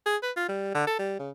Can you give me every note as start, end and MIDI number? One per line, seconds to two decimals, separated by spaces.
0.06 0.16 68
0.23 0.31 71
0.36 0.46 65
0.48 0.72 55
0.74 0.84 50
0.87 0.95 69
0.99 1.15 55
1.19 1.30 49